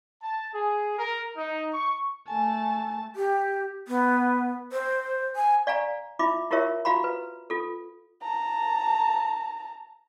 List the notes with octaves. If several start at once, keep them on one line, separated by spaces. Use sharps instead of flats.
A5
G#4
A#4
D#4
C#6
A3 G#5 A5
G4
B3
C5
G#5
D5 F5 G#5 A#5
E4 F4 E5 B5 D6
E4 F4 G4 A#4 C#5 E5
F4 F#4 F5 A#5 B5
B4
F4 A4
A5 A#5